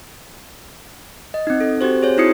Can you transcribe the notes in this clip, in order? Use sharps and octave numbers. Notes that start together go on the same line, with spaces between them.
D#5
C4 D#4
A4
C4 F#4 G4 C5
G#4 C5 C#5
C4 D#4 E4 F#4 D#6 C#7